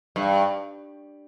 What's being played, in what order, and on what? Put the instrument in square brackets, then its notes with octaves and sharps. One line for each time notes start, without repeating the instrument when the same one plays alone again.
[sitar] G2